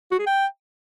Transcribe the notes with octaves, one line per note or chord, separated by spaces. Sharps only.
F#4
G#4
G5